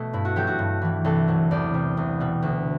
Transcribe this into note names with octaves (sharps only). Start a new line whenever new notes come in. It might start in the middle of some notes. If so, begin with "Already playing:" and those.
Already playing: B2 A3
G2 E4
F#4
F#3 A3 G4
F#4
G2
E3 G3
C2 A4
C3 F#3
E2 D5
C3 G3
C2
B2 G3
D2